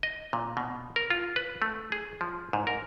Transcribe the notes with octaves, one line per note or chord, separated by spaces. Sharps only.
D#5
A#2
B2
A#4
F4
B4
A3
G#4
F3
G#2
A#4